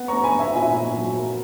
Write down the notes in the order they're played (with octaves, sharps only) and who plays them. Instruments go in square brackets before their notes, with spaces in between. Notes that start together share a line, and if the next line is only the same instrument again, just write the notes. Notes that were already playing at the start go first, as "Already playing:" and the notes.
Already playing: [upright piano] B3
A#5 C#6
B3
G#5 B5
B3
E5 G#5
A#2 E5 G#5
A#2
F#3
A#3